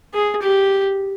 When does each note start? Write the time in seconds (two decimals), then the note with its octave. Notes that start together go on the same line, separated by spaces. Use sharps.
0.14 G#4
0.42 G4